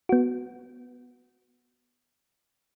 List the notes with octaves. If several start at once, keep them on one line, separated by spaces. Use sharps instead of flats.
B3 F#4